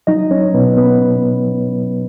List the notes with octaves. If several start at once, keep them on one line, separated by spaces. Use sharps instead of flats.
F#3 D#4 D#5
C#4 C#5
B2 B3 B4
B3 B4
B2
F#3